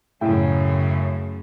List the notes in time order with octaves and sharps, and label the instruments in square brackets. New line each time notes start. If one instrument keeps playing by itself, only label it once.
[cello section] F#2 C#3 A3 [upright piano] A2 E4 G5